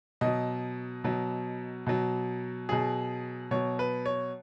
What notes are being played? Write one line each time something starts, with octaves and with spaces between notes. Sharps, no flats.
B2 F#3 D#5
B2 F#3
B2 F#3
B2 F#3 G#4
B2 F#3 C#5
B4
C#5